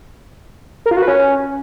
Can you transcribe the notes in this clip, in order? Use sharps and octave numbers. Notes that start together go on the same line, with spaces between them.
A#4
F4
F#4
B4
C#4